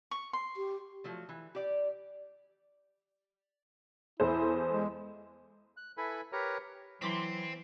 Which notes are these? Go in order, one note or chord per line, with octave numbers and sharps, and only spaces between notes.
C#6
C6
G4
F3 F#3 A3
E3
G4 D5
E2 E4 A4 C5
G#3
F#6
E4 A4 B4 G#5 B5
G4 A#4 B4 C#5 A#5
E3 F#3 C4 C6 D6 B6